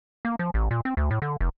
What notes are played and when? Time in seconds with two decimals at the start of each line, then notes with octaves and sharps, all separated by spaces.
0.25 A#3
0.39 F3
0.54 A1
0.71 A#2
0.85 C4
0.97 D2
1.11 A2
1.22 D3
1.41 F1